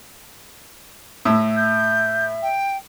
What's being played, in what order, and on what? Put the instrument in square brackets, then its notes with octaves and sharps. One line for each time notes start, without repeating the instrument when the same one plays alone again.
[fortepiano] A2 E6 [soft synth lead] E5
[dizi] G6
G5